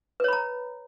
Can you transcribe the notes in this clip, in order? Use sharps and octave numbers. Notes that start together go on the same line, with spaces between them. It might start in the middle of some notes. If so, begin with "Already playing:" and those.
B4 C#5 A#5 B5